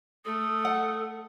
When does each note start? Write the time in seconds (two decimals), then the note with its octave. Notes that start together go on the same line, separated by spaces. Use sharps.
0.25 A3 A4 D#6
0.65 F#5